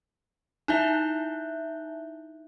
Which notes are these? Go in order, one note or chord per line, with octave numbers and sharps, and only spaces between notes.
D#4 E4 E5